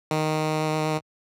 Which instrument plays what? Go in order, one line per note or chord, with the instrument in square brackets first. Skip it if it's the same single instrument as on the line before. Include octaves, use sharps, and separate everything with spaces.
[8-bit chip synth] D#3